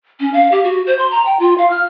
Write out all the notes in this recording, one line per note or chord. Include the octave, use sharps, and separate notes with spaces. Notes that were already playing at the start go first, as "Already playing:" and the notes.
C#4
F5
G4
F#4
C5
C6
A#5
G5
F4
F5
F6